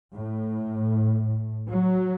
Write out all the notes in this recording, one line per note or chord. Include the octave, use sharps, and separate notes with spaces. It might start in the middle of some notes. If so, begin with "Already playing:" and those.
A2
F#3